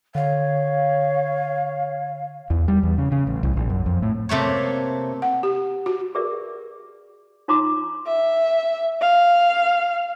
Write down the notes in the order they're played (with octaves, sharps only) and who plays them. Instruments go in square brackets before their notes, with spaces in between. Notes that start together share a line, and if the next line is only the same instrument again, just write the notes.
[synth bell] D3 [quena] C#5 [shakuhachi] F5
[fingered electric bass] E2
G3
E2
C#3
C#3
A1
C2
A#1
F#2
F2
A2
[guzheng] C3 A3 A#3 C#5
[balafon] F#5
G4
F#4
[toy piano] G4 G#4 A#4 B4 D5 E5
D#4 F4 C#5 A#5 C6 D6
[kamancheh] E5
F5